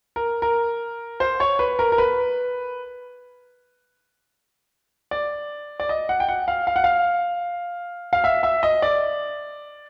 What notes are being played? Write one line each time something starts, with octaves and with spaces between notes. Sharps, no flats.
A#4
A#4
C5
C#5
B4
A#4
A#4
B4
D5
D5
D#5
F#5
G5
F#5
F5
F5
F#5
F5
F5
E5
E5
D#5
D5